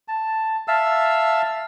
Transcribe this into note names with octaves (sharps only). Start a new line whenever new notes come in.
A5
E5 F5 A5 E6